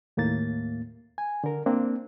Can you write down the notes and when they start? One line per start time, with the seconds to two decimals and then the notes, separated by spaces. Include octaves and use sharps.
0.17 D#2 A2 A#3 A6
1.18 G#5
1.44 D3 A#4
1.66 A#3 C4 D4